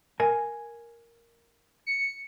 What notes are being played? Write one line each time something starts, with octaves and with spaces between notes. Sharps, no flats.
A#4 G#5
C#7